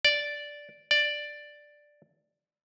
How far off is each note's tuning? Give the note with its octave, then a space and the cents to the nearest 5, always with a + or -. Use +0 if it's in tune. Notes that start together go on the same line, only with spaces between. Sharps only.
D5 -5
D5 +5